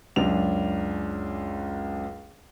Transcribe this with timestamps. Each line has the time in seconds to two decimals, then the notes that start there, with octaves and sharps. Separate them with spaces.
0.16 C#2 F#2 D4 F7